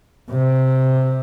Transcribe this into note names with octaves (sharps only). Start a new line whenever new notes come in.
C3